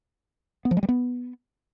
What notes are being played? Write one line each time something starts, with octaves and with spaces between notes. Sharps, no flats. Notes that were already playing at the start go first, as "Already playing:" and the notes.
B3
F3
G#3
G3
B3